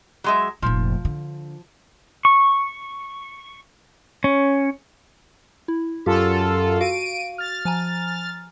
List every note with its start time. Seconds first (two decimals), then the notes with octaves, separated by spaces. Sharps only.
0.24 F#3 G#3 E5
0.62 F1 A#2 F3
1.05 D3
2.25 C#6
4.24 C#4
5.68 E4
6.06 F#2 F4 G4 A4
6.81 F#4 F5 D7 D#7
7.38 F6 A6
7.65 F3 G#5 A#5